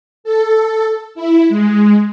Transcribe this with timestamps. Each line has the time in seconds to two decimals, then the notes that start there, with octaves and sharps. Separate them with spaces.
0.24 A4
1.15 E4
1.49 G#3